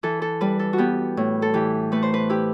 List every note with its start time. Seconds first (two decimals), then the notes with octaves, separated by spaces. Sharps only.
0.03 E3 A4
0.22 A4
0.41 G3 B4
0.59 A4
0.73 F#4
0.78 B3 G4
1.17 A2
1.42 A4
1.54 E3 G4
1.92 A3 B4
2.02 C5
2.14 B4
2.30 E4 G4